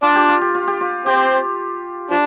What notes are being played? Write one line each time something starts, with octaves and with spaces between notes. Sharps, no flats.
D4 F4 D5
G4
F4
G4
F4
G4
F4
C4 G4 C5
F3 D4